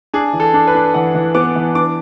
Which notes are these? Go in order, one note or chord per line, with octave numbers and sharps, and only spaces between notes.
D4 G#4
E3
A4
D4
B4
D4
E3 F#5
E3
B3 D6
E3
D4 D6